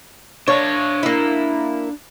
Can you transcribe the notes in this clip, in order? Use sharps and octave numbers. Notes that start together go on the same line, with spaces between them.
D4 C#5 F5 A5
A#3 E4